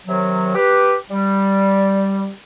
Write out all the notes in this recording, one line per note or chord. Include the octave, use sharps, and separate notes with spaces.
C3 D#3 F#3
G4 B4
G3